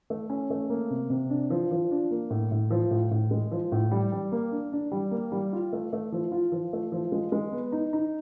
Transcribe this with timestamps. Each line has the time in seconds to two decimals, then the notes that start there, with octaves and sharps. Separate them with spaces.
0.10 A3
0.30 C#4
0.50 A3
0.70 A#3
0.90 C3
1.10 C3
1.30 D4
1.50 F3
1.71 F3
1.91 D4
2.11 A#3
2.30 A2
2.52 A2
2.70 F3
2.91 A2
3.11 A2
3.31 G#3
3.51 F3
3.72 A2
3.91 G3
4.12 G3
4.32 A#3
4.52 D4
4.72 D4
4.92 G3
5.11 A#3
5.32 G3
5.53 F4
5.73 A3
5.93 A3
6.12 F3
6.32 F4
6.52 F3
6.73 A3
6.92 F3
7.12 G#3
7.32 G#3
7.52 B3
7.72 D#4
7.93 D#4